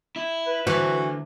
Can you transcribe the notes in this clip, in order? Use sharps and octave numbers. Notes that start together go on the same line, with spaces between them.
E4
B4
D2 E3 F#4